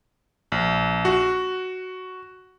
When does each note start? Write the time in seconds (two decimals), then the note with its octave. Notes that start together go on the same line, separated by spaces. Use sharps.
0.52 A#1
1.05 F#4